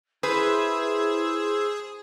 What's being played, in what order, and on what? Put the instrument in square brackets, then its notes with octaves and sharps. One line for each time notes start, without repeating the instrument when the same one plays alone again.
[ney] E4 [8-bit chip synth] G#4 [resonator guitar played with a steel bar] B4 [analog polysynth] C5 E6 G#6